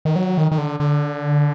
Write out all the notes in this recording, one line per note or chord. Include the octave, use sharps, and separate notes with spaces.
D#3
F#3
D#3
D#3
D3
D3